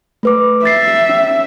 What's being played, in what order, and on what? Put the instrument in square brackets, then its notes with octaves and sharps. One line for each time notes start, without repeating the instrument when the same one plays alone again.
[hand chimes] A3 B4 D6
[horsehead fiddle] E5 [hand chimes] A6 C7
[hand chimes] C#4